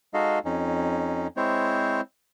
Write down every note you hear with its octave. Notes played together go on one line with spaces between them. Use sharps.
G#3 D#4 F#4 A4 D#5 F5
F2 C#4 D#4
G#3 C4 E4 C5 C#5